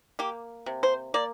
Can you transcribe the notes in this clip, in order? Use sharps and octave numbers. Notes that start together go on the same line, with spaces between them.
A#3 G4
C3
C5
A#3 D5